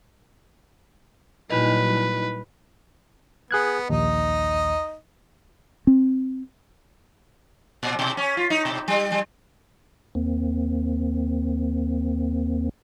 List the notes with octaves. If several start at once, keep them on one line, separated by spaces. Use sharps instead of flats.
A#2 F#3 G3 D#4 E4 B4 D#5
B3 G#4 F#6 G#6
A#1 D#2 D#4 D#5
C4
A#2
B2
C#4
F4
D#4
B2
G3
G3
D#2 A#3 C4